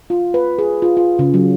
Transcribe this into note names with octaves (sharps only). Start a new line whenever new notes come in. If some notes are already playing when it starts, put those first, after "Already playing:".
F4
B4
G#4
F4
F4
C#3
F#3